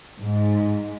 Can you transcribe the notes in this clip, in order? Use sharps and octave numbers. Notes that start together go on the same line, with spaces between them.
G#2